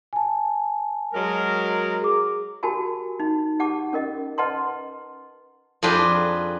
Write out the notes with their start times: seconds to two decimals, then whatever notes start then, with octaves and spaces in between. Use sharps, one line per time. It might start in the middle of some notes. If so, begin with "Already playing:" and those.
0.13 G#5 A5
1.14 F#3 G#3 A#4
2.02 G#4 D6
2.63 F#4 G4 A#4 G#5 A5 B5
3.20 D#4
3.60 G4 F#5 A5 D6
3.93 C#4 A#4 D#5
4.38 B4 D#5 F#5 A5 A#5 C6
5.83 F2 D4 F4 G#4 B4 G5